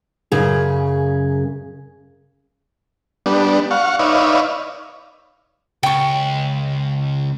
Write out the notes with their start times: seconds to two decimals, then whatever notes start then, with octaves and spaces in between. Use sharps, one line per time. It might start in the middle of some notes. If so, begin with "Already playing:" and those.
0.32 F#2 C#3 G#4
3.26 G3 B3 D4
3.71 F5 F#5 C#6
3.99 D#4 B4 C#5 D5 E5 F5
5.83 C#2 G5 C#6